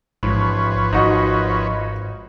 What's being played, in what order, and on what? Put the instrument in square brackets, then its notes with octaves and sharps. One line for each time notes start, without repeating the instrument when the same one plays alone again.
[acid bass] A1 [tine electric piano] G#2 [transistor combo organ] F3 B4 C#5
[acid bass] G#1 [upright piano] D#4 F#4 D#5